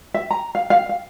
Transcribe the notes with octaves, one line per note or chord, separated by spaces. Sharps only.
E5
A#5
F5
F5
F5